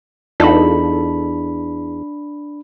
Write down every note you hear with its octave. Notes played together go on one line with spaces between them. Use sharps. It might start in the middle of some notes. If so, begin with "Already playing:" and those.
E2 D4 D#4 F4 A4 B5